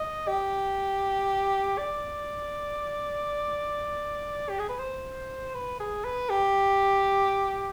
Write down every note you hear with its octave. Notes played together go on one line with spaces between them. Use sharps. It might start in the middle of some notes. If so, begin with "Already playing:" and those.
Already playing: D#5
G4
D5
G4
G#4
B4
C5
B4
G#4
B4
G4